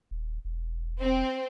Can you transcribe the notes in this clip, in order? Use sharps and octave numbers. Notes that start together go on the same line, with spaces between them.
D#1
E1
C4